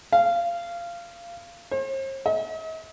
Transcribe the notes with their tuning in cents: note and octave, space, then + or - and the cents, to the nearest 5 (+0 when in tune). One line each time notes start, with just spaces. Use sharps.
F5 -20
C5 +45
D#5 +45